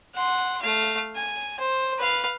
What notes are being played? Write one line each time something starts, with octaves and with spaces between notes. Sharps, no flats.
F#5 C6
A3 F5
G#5
C5
B4 F5